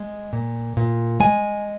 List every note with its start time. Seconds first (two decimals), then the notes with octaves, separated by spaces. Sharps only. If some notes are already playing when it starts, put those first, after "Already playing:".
Already playing: G#3
0.33 A#2
0.77 A#2
1.20 G#3 G#5